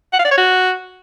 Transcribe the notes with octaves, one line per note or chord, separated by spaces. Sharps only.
F#5
F5
D5
C#5
F#4